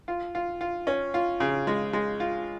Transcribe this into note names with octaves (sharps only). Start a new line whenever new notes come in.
F4
F4
F4
C#4
F4
C#3
G#3
G#3
F4